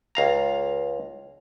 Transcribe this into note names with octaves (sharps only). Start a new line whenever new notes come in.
C#2 F5 A#5